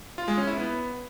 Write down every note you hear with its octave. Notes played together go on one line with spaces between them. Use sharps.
F4
G#3
C#4
E4
B3